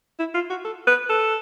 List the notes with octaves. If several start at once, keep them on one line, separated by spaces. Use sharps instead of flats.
E4
F4
F#4
A4
B4
A4